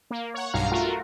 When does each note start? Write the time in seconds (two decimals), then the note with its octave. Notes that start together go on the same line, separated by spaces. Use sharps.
0.11 A#3
0.34 C#5 F#5
0.53 B1 G2 F5 A#5 F6
0.71 A3 F4 F#4 A#4